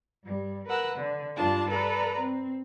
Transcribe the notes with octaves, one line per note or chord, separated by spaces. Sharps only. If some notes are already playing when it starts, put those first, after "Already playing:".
G2 G3
A#4 B4 F#5 E6 F#6
D3
G2 D4 F4 A5
A4 B4 D5 A#5
C4